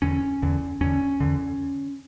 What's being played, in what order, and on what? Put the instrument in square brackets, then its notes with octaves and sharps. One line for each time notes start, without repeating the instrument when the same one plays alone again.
[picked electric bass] E2 D3 C#4
E2 D3
E2 D3 C#4
E2 D3